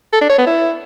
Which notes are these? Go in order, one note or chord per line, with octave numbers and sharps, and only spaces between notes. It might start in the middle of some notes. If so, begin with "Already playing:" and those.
A4
D4
C#5
B3
E4